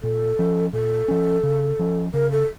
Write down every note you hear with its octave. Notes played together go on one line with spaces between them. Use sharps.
A#2 A4
F3 C#4
A#2 A4
F3 C#4
C#3
F3 C#4
C#3 A#4
A4